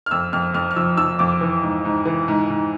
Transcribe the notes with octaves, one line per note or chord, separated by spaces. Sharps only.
F6
F2 E6
F2 F6
F2 F6
F6
F3 E6
F3 E6
F2 D6
E3
G#2
G#2
E3
G#2
G#2